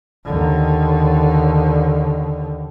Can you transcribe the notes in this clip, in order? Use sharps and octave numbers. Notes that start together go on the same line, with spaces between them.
D#2 D3